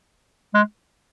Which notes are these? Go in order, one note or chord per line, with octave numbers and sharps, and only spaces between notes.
G#3